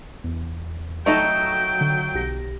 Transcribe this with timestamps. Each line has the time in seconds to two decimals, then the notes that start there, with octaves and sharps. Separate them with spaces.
0.24 E2
1.06 F#3 A3 D#4 A4 G5 C#6 A#6 E7
1.81 D3
2.14 B1 G4 A#6